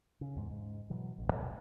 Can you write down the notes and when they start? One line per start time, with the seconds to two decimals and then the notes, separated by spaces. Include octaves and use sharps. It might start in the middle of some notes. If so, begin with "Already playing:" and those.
0.21 C#3
0.36 E2 G#2
0.51 G#2
0.90 B2 E3 F#3
1.18 A1 D2
1.32 B2